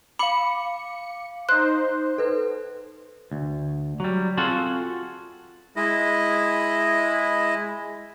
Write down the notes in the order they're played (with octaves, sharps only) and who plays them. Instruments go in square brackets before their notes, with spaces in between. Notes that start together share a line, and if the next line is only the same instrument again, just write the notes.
[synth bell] F5 D6 [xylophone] B5 [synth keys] C#7
[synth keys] D#4 C5 [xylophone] F#6
[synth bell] A4 B4
[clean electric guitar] D2
F#3 G3
C4 F4 F#4 G#4 A4
[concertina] G#3 E4 D#5